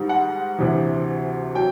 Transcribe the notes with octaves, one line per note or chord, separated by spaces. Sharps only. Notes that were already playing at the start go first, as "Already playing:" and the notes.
Already playing: G#2 D#3 G3
F#5
D2 C3 E3
F#3 G5